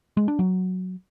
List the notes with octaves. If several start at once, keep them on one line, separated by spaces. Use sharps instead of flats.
G#3
D4
F#3